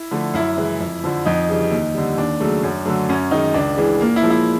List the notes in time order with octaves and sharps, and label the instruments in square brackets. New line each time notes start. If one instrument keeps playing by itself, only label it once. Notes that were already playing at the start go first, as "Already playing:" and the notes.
Already playing: [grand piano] E4
D3 F3 A3
F#2 E4
C#3 E3 G#3
F2
D3 F3
F2 D#4
C#3 E3 G3
D#2
D3 G3
D#2 D4
C#3 F#3 A3
F#2
D3 F#3 A3
F#2 C#4
D#3 G#3 D#4
C#2 D4
C#3 E3 G#3
A#2 A#3
E4
F3 G#3
E4